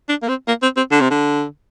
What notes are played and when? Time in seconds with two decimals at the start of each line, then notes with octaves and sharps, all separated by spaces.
0.09 D4
0.23 A#3
0.29 C4
0.48 A#3
0.63 C4
0.77 C4
0.92 D3
1.01 C3
1.11 D3